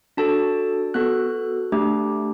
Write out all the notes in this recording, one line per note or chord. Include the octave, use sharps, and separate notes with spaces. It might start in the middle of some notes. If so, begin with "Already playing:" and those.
D4 F#4 A4 A5
B3 F#4 A4 F#6
A3 D4 G4